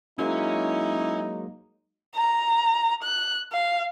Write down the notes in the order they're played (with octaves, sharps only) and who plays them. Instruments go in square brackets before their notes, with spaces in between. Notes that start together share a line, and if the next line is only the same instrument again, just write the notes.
[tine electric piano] F#3 G#3 A#3 [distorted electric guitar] C#4 [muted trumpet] D#4 [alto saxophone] E4
[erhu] A#5
F#6
F5